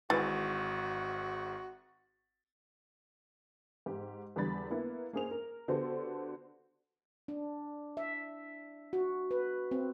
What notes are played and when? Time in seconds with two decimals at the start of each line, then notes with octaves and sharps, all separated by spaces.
0.10 G#1 G#2 E3 F#4 A6
3.86 G#2 G4
4.36 E2 D3 G3 B5 A6
4.70 A#3 B3 E4 B4
5.13 A#3 C#4 G#4 C5 F7
5.31 A#4
5.68 D3 B3 F#4 G4 A4 C5
7.28 D4
7.97 E5
8.93 F#4
9.31 B4
9.71 C4